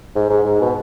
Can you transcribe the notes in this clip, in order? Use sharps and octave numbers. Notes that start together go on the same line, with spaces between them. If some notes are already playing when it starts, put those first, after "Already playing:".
G#2
G#2
G#2
B2